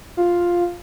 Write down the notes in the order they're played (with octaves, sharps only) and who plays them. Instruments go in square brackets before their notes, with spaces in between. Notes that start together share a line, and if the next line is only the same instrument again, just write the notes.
[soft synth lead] F4